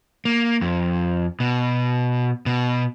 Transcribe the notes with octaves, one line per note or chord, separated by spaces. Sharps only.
A#3
F2
B2
B2